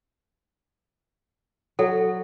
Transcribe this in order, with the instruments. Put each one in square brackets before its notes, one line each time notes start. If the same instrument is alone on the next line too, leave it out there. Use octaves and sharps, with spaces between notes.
[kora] F#3 [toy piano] A4